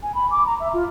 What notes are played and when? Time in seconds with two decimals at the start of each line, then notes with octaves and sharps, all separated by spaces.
0.03 G#5
0.15 B5
0.31 D6
0.46 A#5
0.60 E5
0.74 F4